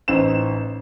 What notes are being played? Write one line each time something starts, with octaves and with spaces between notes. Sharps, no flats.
A1 D#4 C5 E7